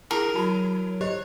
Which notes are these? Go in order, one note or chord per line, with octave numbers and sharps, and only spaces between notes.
E4 G#4 A#4 A5
F#3 F#4 A5 B5
G4 C5 C#5 D#5